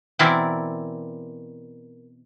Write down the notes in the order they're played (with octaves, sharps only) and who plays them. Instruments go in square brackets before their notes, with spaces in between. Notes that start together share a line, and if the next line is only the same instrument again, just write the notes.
[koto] B2 E3 C4 E4 A#4 D5